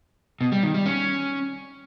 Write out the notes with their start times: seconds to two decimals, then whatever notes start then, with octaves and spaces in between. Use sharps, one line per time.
0.41 B2
0.52 G3
0.63 D#3
0.74 G3
0.86 C#4